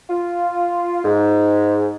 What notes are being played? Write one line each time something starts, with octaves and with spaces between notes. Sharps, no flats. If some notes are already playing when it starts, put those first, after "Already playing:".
F4
G#2